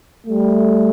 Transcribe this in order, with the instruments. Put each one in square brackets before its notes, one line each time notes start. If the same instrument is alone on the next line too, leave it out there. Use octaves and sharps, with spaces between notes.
[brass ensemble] G3 A3